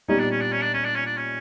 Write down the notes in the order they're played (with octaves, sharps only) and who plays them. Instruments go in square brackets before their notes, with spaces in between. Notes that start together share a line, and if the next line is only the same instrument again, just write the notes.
[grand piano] A#2 G3 B3 D#4 [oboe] C#4
[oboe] D4
C#4
D4
C#4
D4
C#4
D4
C#4
D4
C#4